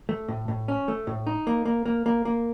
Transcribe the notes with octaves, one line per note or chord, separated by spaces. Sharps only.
A3
A2
A2
C#4
A3
A2
D#4
A#3
A#3
A#3
A#3
A#3